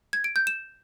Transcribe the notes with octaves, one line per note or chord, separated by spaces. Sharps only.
G#6
D7
G6
E7